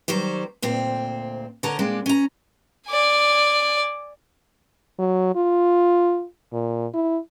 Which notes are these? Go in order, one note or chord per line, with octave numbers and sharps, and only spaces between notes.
D#3 F#3 G3 C5
D2 A#2 C4 C5
D3 A#4 C#5 F#5 A5 A#5
A#2 G#3 A#3 C4 D4
C#4 A#5
D5 G#5
F#3
F4
A#2
E4